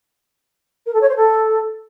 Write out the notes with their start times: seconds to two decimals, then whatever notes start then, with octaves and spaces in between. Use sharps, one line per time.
0.86 A#4
0.93 A4
1.01 C#5
1.08 C5
1.16 A4